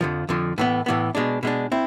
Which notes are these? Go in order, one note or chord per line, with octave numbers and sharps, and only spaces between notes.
F2 D3 F3
F2 D3 F3
A2 E3 B3
A2 E3 B3
B2 G#3 D4
B2 G#3 D4
C4 E4